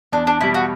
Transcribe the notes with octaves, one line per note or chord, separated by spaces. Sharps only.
E2 D4
D4
B2 G3 E4
F#4